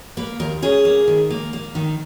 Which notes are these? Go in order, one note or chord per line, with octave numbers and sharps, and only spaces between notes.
A#3 B4
D#2 A#4
C#4 G#4
A#3
D#3
A#3
A#3
D#3